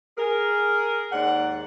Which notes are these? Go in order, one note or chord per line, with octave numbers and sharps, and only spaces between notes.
G#4 A#4
D#2 G#2 D5 F#5